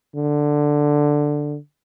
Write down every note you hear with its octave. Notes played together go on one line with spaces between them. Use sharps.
D3